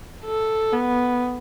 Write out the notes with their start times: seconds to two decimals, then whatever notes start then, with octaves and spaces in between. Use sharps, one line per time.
0.25 A4
0.72 B3